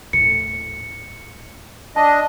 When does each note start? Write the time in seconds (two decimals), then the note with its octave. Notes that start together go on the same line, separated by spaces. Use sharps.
0.13 D#1 A2 C#7
1.96 D4 D#5 A5